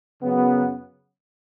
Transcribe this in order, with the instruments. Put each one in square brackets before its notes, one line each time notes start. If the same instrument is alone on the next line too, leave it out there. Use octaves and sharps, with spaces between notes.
[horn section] F#2 C#3 F#3 B3